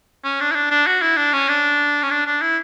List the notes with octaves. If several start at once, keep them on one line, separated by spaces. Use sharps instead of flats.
C#4
D4
E4
D4
D4
F#4
E4
D4
C#4
D4
C#4
D4
D4
E4